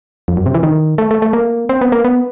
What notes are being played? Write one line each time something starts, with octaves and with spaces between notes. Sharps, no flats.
F2
F#2
C3
E3
D#3
A3
A3
A3
A#3
C4
B3
A#3
B3